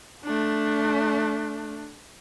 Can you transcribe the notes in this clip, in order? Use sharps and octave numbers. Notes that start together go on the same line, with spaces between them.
A3 D4